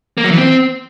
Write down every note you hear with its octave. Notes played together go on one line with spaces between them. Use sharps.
A#3
F#3
E3
C4